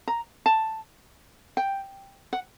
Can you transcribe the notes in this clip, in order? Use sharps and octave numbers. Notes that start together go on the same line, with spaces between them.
A#5
A5
G5
F#5